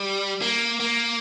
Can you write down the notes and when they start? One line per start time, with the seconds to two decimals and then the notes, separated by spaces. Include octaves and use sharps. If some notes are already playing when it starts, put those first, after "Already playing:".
Already playing: G3
0.42 A#3
0.80 A#3